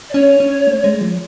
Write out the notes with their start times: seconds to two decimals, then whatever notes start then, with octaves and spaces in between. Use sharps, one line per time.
0.10 D5
0.14 C#4 C#5
0.40 C#4
0.67 A3
0.84 G#3
1.01 F3